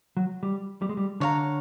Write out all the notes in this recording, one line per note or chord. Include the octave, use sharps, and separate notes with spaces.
F#3
G3
G3
G#3
G3
D3 C#5 F5 A#5